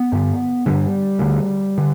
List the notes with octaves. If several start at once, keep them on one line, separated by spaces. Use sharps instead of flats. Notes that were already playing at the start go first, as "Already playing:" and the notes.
Already playing: B3
G2 D3
G2 D3 G3
D2 D3
D3